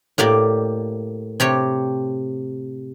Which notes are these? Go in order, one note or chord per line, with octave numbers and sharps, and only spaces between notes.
A2 A#3 G4 D5
C3 G4 C#5